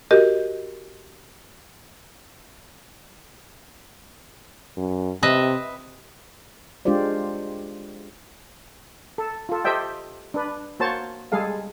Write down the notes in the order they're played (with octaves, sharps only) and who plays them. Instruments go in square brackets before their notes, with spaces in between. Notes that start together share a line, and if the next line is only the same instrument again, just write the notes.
[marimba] F#4 G4 A#4 D#5
[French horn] F#2
[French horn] C3 [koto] B4 D#5 E5
[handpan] G#3 D4 F4 G4 C5 D5
[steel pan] A4
F4 A4
G4 A4 C5 D#5 E5 G5
D4 B4
A#3 F#4 C5 C#5 A5
G3 G#3 G#4 A4 F5